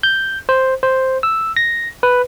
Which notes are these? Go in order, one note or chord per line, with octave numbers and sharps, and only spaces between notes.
G6
C5
C5
E6
A#6
B4